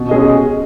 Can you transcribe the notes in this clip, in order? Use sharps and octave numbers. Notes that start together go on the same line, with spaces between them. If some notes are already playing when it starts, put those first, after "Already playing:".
Already playing: B2
G#3 C#4 G#4 D#5